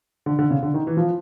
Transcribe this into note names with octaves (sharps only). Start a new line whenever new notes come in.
D3
D3
C#3
D3
D#3
E3
F3